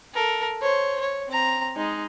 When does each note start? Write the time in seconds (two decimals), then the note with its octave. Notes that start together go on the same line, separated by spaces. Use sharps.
0.14 A4 A#4
0.62 C5 C#5
1.00 C#5
1.29 C4 A#5
1.76 G#3 D#4